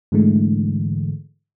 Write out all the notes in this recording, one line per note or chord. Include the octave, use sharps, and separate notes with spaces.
G#2 D3 E3 G#3 A3